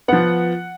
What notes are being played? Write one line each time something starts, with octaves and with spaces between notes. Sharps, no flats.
F3 B3 F#5